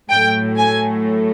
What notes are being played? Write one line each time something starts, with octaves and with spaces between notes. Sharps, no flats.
A2 F#3 A3 G5
G#5